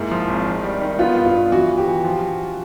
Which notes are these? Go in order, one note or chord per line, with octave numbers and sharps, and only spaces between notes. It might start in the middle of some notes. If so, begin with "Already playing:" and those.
Already playing: G#2 A#3 E4
F3
G#1
D#3
G3
D#3
B3 F4
G2
F4
B3
E3 F#4
E3
G4
E3
F3
F3